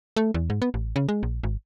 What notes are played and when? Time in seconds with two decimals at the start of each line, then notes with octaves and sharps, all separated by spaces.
0.17 A3
0.34 E2
0.50 G#2
0.62 B3
0.74 A1
0.96 C#3
1.09 G#3
1.23 A#1
1.43 G#1